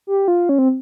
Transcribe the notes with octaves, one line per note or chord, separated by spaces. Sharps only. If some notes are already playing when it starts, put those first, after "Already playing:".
G4
F4
C#4
C4